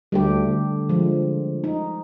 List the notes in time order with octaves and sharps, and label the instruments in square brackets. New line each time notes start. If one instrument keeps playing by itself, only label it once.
[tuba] D2 [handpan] G3 A3 G4
[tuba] D3
[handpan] F3 G#3
D#4